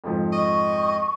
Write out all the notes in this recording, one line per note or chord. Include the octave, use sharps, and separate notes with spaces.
F2 G#2 F3
D#5 C#6